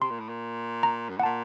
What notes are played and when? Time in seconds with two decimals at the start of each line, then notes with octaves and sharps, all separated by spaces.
0.01 C3 C6
0.10 A#2
0.20 A2
0.28 A#2
0.83 A#5
1.09 F#2
1.17 A2 F#5
1.23 A#2 A5